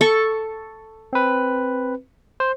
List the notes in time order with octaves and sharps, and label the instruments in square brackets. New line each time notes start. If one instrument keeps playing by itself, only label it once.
[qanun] A4 C#6
[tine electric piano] C4 B4
C5